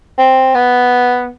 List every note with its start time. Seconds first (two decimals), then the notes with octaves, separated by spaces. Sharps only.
0.19 C4
0.55 B3